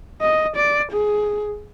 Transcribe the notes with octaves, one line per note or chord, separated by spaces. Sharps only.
D#5
D5
G#4